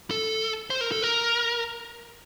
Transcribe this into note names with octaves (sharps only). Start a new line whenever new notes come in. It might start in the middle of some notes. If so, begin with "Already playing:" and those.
A4
C5
A#4
A4
A#4